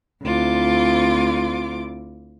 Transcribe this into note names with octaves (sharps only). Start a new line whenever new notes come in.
D2 C4 E4 F4 D6